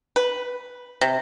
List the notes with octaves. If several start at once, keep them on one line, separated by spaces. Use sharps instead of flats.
B4
C3